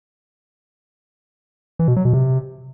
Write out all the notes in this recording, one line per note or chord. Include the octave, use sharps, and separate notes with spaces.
E3
B2
F#3
B2
C3